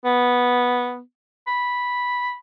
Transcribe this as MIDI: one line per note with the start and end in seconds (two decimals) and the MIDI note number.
0.05 1.00 59
1.47 2.35 83